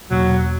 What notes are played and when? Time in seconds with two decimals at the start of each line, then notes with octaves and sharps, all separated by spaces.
0.11 E2 B2 F#3 A#3 D4